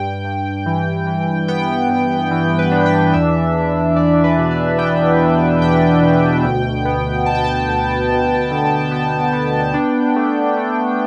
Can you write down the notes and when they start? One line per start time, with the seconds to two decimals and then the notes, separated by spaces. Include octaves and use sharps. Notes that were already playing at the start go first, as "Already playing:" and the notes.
Already playing: G2 G5
0.24 G2
0.66 E3
1.07 E3
1.48 B3 G5
1.89 G2
2.31 E3
2.59 B4
2.71 D4
2.86 G5
3.13 E2 E5
3.54 E2
3.96 E2 D5
4.24 B4
4.37 B2
4.51 D5
4.78 B3 G5
5.20 B2
5.61 E2 G5
6.03 B2
6.44 D2
6.85 B3
7.26 D2 A5
7.35 G5
7.44 A5
7.68 D2
8.09 D2
8.51 D3
8.91 B3 G5
9.33 B3
9.74 D4
10.16 A3
10.57 A3